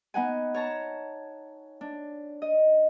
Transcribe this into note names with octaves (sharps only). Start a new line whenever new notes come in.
B3 D#4 F#5 G#5
C#5 A5 A#5
D4
D#5